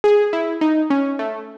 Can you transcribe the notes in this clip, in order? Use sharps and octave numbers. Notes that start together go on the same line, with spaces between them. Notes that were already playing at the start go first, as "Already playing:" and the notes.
G#4
E4
D#4
C#4
A3